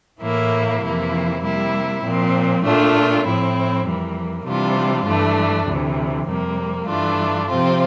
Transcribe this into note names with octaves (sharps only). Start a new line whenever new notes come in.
A2 E3 A#3 E4
F2 C3 E3 A#3 E4
C3 G3 A#3 E4
A#2 F3 C4
A#2 A3 D4 F4
A2 F3 C4 E4
F2 E3 G3 A#3
C3 E3 G3 D4 F4
G2 E3 A3 D4
D2 C3 E3
F2 C3 G3 A#3
G2 E3 A3 D4 F4
C3 F3 C4 F4